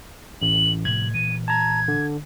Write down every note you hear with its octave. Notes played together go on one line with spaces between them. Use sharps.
A1 F#7
A2 C3 F3 G#6 F#7
A#2 E3 D#7
A5 A#5 G#6
D3